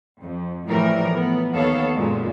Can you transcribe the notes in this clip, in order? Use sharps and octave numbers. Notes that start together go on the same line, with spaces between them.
F2
A2 E3 F3 G3 A#4
B3
D#2 B3 A4 C#5 F5
F#2 A#2 G#3